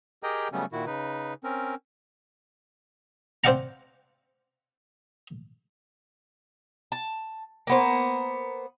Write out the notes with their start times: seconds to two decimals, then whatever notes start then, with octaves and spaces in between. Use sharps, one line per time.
0.23 G4 G#4 A#4 D#5 G5 A#5
0.52 C#3 F#3 G3 A3 B3 C#4
0.73 A#2 D#3 E4 F#4
0.86 C#3 D#4 B4
1.44 C4 C#4 A#4
3.44 C4 C5 D5 F5 F#5 A#5
6.92 A5
7.67 A#3 B3 C5